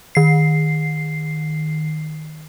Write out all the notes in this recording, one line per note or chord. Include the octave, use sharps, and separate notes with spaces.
D#3 C7